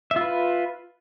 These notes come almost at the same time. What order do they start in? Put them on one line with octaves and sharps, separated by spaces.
E5 F4 B4